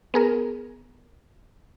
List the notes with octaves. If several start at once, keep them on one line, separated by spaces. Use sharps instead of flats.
B3 G#4 A#4